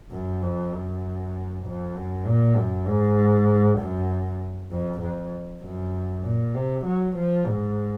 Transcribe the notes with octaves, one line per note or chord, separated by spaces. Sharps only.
F#2
F2
F#2
F2
F#2
A#2
F#2
G#2
F#2
F2
F2
F#2
A#2
C3
F#3
F3
G#2